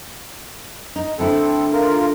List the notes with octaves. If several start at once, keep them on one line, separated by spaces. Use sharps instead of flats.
D#4
D3 A3 C4 E4 A4
F4 A#4